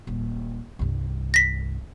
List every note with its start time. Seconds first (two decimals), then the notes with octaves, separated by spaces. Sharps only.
0.07 D#1
0.79 C2 G2
1.34 A#6 B6